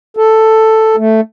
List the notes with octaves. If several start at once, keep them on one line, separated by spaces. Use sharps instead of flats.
A4
A3